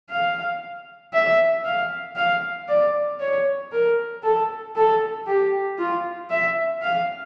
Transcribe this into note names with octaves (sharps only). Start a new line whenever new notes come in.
F5
E5
F5
F5
D5
C#5
A#4
A4
A4
G4
F4
E5
F5